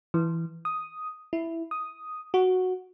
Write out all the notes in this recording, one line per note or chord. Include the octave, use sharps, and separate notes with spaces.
E3
D#6
E4
D#6
F#4